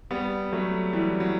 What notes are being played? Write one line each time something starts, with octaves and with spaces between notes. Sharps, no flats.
G3 B3
F#3 A3
E3 G3
F#3